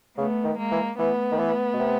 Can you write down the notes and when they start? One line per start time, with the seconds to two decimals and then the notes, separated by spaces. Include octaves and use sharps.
0.17 C#3 A3 B3
0.44 D#3
0.58 G#3 A#3
0.71 E3
0.99 E3 A3 B3
1.31 D#3
1.39 E3
1.74 B2
1.80 C3